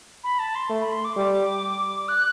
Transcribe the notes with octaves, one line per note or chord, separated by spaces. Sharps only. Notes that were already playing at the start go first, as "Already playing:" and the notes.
B5
A5
C6
A3
B5
C6
D6
G3 D6
F#6